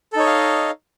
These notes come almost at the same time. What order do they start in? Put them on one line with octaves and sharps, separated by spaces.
A4 D#4 C#5 D#5 F5